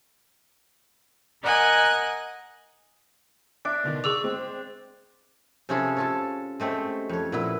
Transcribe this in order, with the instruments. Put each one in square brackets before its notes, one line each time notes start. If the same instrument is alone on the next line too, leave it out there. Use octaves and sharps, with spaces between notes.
[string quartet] A#4 D#5 F#5 G#5 F#6
[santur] D4 [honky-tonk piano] E5 D7
[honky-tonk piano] B2 D3 D#3
[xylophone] G#4 E6 F7 [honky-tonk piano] C#6 D6
[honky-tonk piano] G#3 C4
[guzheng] C3 C#4 F4 G#4 A4 B5
F4 A4 C#5
G#3 A3 C4 C#4 G4
F2 C#5
A#2 B3 E4 B4